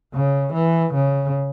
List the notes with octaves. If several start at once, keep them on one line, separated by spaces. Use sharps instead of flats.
C#3
E3
C#3